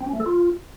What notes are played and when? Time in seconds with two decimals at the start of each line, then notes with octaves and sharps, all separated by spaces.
0.01 C4
0.07 C#4
0.13 A3
0.20 A4
0.26 F4